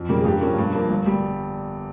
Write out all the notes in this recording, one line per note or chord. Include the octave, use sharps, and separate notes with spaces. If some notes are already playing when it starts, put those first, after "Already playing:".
Already playing: F2
C#3 G3 A#3
G#4
G2 G4
F3 A#3 C#4
G2
F3 A#3
G1
G3